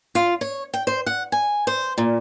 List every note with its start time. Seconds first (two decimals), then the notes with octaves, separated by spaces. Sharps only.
0.15 F4
0.41 C#5
0.74 G5
0.87 C5
1.06 F#5
1.32 G#5
1.67 C5
1.98 A#2